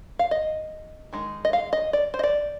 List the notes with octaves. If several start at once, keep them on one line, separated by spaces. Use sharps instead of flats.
F5
D#5
D#3 G#3 D#4
D#5
F5
D#5
D5
C5
D#5
D5